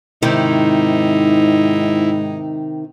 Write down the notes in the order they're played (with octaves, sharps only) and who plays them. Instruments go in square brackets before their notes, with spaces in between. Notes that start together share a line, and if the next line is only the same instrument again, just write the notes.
[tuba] G#2 [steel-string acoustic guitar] C3 D#3 [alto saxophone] D#4 [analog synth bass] E4